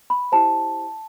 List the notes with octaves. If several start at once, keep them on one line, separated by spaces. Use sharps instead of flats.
B5
E4 G4 C5 A5